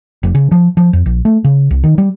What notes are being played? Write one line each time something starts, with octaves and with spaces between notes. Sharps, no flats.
F1
C#3
F3
F3
F2
A#1
A3
C#3
C2
D#3
G3